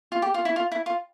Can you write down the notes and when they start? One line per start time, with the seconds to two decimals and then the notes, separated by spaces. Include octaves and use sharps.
0.12 F4
0.22 G4
0.34 F4
0.45 E4
0.56 F4
0.72 E4
0.86 F4